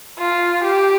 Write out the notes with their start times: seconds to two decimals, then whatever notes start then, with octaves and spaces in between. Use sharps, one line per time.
0.19 F4
0.64 G4